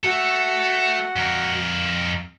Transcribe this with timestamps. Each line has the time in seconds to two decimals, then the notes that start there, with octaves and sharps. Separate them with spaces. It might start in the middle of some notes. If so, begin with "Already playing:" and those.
0.04 F#4 A4 E5
1.16 F2 A#4